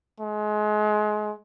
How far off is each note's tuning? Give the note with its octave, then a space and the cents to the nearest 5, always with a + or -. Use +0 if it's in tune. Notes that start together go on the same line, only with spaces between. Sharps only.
G#3 +30